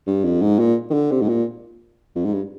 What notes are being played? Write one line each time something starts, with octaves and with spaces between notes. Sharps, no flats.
G2
F2
G#2
A#2
D#3
D3
C3
G#2
A#2
F2
G#2
G2